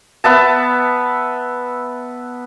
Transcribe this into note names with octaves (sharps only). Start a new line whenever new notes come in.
B3 E5 A5